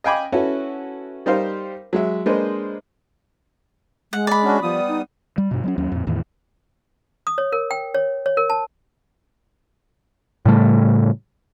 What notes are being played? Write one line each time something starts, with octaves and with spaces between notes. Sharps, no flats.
D#5 F5 G5 G#5 B5 D6
C#4 E4 F#4 A4 B4
G3 D#4 G4 A#4 C5 F5
F#3 G#3 E5
G#3 A#3 D4 B4 C5 D#5
G#3 F#5
D5 B5
C#4 D4 F#4
F3 G3 B3 D#6
D#4
G3
G2 B2
F#3 A#3 C#4
D#2 F#3 C#4
F2 A#2
E2 A2 D#3
D#6
C#5
A#4
G5
C#5
C#5
A#4
A5
A2 C#3 G3 A3